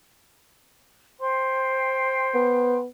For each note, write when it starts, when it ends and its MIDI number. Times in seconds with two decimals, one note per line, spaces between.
1.19 2.77 72
1.19 2.77 79
1.19 2.77 84
2.35 2.85 59